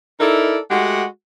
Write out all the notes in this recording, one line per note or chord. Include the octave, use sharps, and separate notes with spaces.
D#4 E4 A4 A#4 D5
G#3 A3 F#4 G4 F#5